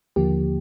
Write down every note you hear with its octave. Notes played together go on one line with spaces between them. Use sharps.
D#2 D3 F3 A#3 G4